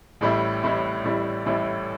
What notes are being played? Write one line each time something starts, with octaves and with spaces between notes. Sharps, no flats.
A1 A2 G3 E4
A1 A2 G3 E4
A1 A2 G3 E4
A1 A2 G3 E4